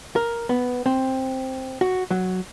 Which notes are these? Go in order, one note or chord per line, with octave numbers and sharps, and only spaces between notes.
A#4
B3
C4
F#4
F#3